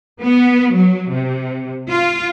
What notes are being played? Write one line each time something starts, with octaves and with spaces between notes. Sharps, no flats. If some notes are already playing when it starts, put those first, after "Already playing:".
B3
F#3
C3
F4